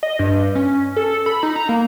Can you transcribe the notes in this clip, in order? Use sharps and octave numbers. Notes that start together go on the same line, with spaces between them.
D#5
G2
C#4
A4
B5
D#4
A#5
A#3